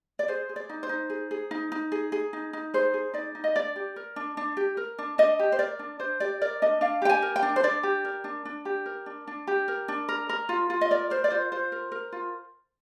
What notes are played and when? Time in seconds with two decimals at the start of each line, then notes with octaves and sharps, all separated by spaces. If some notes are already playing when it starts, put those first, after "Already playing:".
0.19 D5
0.28 G#4 C5
0.49 G#4
0.56 D5
0.69 D#4
0.83 C5
0.89 D#4
1.10 G#4
1.31 G#4
1.51 D#4
1.72 D#4
1.92 G#4
2.12 G#4
2.33 D#4
2.53 D#4
2.74 G#4 C5
2.94 G#4
3.14 D#4 D5
3.35 D#4
3.44 D#5
3.56 D4 D5
3.76 G4
3.96 A#4
4.16 D4
4.37 D4
4.57 G4
4.77 A#4
4.98 D4
5.18 D4 D#5
5.39 G4
5.52 C5
5.59 A#4 D5
5.79 D4
6.00 D4 C5
6.20 G4 D5
6.41 A#4 D5
6.62 D4 D#5
6.81 D4 F5
7.02 G4 G5
7.10 G#5
7.22 A#4
7.36 G5
7.42 D4
7.56 C5
7.63 D4 D5
7.83 G4
8.05 A#4
8.24 D4
8.45 D4
8.65 G4
8.86 A#4
9.06 D4
9.27 D4
9.47 G4
9.68 A#4
9.88 D4
10.09 A#4
10.29 A#4
10.49 F4
10.70 F4
10.81 D#5
10.91 A#4 D5
11.10 A#4 C5
11.24 D5
11.30 F4 C5
11.52 F4 C5
11.72 A#4
11.92 A#4
12.12 F4